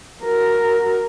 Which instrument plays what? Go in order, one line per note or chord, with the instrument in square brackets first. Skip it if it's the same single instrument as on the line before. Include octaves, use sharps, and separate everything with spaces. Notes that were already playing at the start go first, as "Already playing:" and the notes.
[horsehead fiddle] F#4 A#4